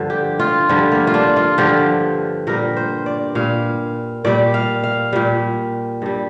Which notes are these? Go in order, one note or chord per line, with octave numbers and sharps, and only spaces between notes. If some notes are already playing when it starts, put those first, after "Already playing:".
Already playing: G2 D3 F3
G4
F4
G2 D3 F3 G3
A#3
F4
D4
F4
G2 D3 F3 G4
A#2 G3 A#4
C5
D5
A#2 G3 F5
A#2 G3 D5
F5
F5
A#2 G3
G2 G3